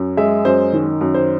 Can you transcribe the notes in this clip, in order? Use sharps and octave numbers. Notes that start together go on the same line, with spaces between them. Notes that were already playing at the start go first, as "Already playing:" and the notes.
Already playing: F#2
G#3 E5
F#2 C5
D#3
F#2
C5